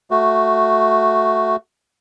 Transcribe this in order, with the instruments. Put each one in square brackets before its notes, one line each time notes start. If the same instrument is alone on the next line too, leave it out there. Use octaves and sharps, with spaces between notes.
[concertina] A3 F#4